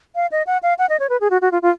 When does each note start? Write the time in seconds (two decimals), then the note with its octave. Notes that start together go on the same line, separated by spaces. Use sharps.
0.15 F5
0.32 D#5
0.47 F#5
0.63 F5
0.79 F#5
0.89 D#5
1.00 C#5
1.10 B4
1.21 G#4
1.30 F#4
1.42 F#4
1.52 F4
1.62 F4